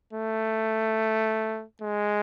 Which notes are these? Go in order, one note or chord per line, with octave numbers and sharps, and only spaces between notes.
A3
G#3